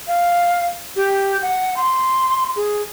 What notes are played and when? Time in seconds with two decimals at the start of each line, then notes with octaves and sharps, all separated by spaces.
0.08 F5
0.96 G4
1.42 F#5
1.77 C6
2.56 G#4